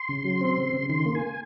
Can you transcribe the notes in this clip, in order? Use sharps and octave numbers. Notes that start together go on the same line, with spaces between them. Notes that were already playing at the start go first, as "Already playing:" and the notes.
Already playing: C6
C#3
F#3
C4
C#3
C#3
D#3 C6
A#3
G#5